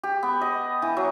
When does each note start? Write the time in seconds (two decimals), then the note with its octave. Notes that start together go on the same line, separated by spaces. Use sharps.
0.03 G4
0.23 B3
0.41 D#5
0.82 E3
0.97 F#3